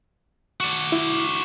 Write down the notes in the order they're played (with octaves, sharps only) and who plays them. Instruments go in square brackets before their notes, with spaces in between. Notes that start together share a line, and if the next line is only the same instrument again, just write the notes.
[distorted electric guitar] F#4 D5
[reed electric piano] E4